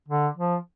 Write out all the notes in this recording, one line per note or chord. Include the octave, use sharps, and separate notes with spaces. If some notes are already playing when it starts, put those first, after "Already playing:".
D3
F3